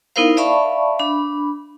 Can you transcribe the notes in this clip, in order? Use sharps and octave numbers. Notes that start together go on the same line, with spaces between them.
B3 D#4 E4 A#4 C5 F5
D5 E5 F5 A5 B5 C#6
D4 B5